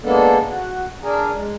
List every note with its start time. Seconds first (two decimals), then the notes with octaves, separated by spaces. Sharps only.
0.03 G#3 A#3 B3 D4 A4
0.49 F#4
1.02 D4 G#4 A#4
1.35 G#3